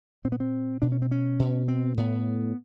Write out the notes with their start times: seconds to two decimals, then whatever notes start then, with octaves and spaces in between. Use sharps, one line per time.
0.24 A#2 C4
0.32 B3
0.40 C4
0.82 B2 D4
0.92 C#4
1.02 C4
1.11 C#4
1.39 B2
1.68 C4
1.97 A2 B3